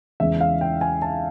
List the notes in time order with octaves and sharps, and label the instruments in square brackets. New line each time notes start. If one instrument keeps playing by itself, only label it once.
[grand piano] E2 C#3 E3 G#3 B3 E5
F5
G5
G#5
A5